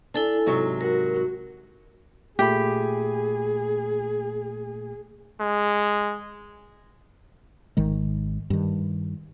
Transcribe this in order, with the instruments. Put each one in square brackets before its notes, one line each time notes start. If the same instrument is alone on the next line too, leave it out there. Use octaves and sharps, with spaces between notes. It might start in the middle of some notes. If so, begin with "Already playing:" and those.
[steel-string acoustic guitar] D4 [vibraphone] E4 A4 G#5
[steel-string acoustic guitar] G#2 C3 F#3
[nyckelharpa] F#4 [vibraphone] A#4
[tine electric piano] A#2 A3 B5 [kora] G4 [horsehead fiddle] G#4
[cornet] G#3
[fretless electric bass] G#1 D#3 G#3
G2 D#3